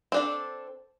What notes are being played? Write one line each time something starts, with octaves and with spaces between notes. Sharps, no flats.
C4 D4 A4